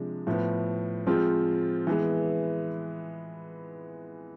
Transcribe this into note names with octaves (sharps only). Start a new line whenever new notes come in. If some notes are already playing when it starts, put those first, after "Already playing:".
Already playing: C3 F3 G#3 D4
A2 F3 B3
F3 G#3 C4 F4
E3 G#3 B3